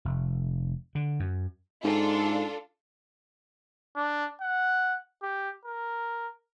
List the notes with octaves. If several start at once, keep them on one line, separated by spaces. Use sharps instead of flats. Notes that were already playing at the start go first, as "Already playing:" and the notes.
F1
D3
F#2
G#2 D4 F4 A4
D4
F#5
G4
A#4